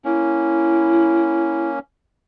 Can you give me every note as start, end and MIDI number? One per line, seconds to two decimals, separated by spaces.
0.05 1.79 58
0.05 1.79 61
0.05 1.69 64